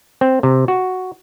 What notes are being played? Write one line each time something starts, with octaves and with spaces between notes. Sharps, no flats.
C4
C3
F#4